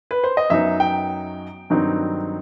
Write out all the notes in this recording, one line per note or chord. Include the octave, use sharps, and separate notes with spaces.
B4
C5
D#5
F#2 F#3 B3 D#4 E5
G5
G2 D#3 F#3 C4 D#4